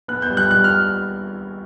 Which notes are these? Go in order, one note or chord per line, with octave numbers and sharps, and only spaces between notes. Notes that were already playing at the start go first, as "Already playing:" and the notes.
B3 F#6
G6
G3
F#6
G3 F#6
F6